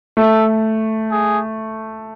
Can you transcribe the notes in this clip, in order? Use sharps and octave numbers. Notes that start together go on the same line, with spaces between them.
A3 A4
G#4